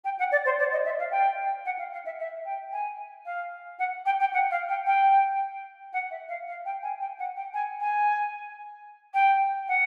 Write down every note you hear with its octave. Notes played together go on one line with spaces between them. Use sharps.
G5
F#5
D5
C5
D5
D#5
E5
F5
G5
F#5
F5
F5
E5
E5
G5
G#5
F5
F#5
G5
G5
F#5
F5
G5
G5
F#5
E5
F5
F5
G5
G#5
G5
F#5
G5
G#5
G#5
G5
F#5